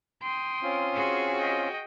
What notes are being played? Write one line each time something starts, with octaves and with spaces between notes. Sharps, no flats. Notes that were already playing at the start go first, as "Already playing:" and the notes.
G5 C6 D#6
C4 C#4 F4
F#4 G#4
D#5 G5